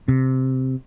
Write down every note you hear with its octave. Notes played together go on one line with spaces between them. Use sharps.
C3